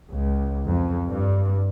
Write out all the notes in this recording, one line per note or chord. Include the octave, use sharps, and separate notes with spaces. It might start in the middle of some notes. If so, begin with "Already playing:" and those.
C#2
F2
G2